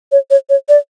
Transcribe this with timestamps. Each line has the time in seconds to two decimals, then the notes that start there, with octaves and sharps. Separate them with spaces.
0.12 C#5
0.31 C#5
0.49 C#5
0.69 D5